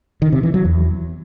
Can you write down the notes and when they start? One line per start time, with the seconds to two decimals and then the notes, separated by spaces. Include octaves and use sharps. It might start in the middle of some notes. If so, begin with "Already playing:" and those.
0.22 D#3
0.33 C3
0.43 E3
0.54 F#3
0.65 E2